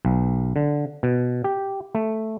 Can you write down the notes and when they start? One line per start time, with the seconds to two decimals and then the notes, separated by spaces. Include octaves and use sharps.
0.05 B1
0.56 D3
1.03 B2
1.44 G4
1.95 A3